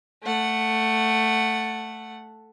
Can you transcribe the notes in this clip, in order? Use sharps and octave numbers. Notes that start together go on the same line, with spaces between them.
A3 F#5